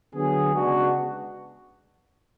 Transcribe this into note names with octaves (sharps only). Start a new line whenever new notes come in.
D3 F#3 B3 G#4
C#3 G#3 B3 D4 F#4